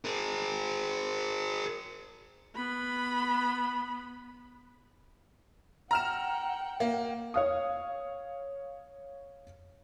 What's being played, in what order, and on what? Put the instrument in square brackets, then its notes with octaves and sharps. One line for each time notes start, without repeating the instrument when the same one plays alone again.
[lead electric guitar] G#4 A#4
[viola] B3 B5
[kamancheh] F#5 G5 [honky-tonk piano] A#5 F6 E7
[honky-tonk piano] A#3
[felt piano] C#5 F5 D#6